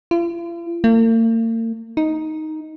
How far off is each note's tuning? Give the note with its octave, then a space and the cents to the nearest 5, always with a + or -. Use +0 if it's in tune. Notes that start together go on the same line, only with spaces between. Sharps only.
F4 -45
A#3 -45
D#4 +5